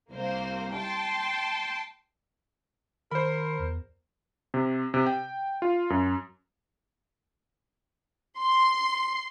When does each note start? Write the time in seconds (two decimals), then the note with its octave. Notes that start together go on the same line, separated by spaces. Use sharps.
0.12 C2 A#3 C5
0.73 G5 A5 C6
3.11 D#3 A#4 C5 B5
3.59 E2
4.54 C3
4.94 C3
5.06 G5
5.62 F4
5.90 F#2
8.38 C6